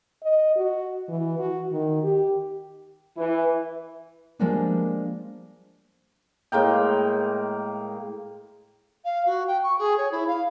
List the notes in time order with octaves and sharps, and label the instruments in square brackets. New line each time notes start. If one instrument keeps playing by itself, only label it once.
[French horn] D#5
F#4
E3
F#4
D#3
G4
[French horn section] E3
[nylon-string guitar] F3 G3 G#3 A#3 B3 D4
[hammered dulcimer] A2 G#3 A#3 G5
[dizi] F5
F#4
G5
C#6
G#4
C#5
E4
F5